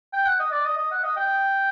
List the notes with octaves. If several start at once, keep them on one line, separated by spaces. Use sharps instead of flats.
G5
F#5
D#5
D5
D#5
D#5
F#5
D#5
G5